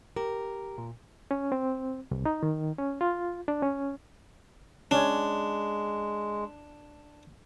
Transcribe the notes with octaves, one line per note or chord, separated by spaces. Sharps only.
G4 A#4
A#2
C#4
C4
C2
D#4
D#3
C#4
F4
D4
C#4
G#3 C#4 D4